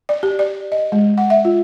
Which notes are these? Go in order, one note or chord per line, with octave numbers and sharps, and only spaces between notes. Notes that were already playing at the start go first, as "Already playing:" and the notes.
D5
G4
D5
D#5
G#3
F#5
E5
F4